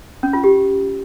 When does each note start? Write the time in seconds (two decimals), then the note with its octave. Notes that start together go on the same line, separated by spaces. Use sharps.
0.23 C#4
0.33 F4
0.44 G4